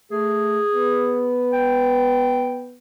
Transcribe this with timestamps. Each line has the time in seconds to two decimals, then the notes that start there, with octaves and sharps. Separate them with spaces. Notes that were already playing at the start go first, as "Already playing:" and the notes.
0.12 A3 G#4
0.75 B3
1.53 G5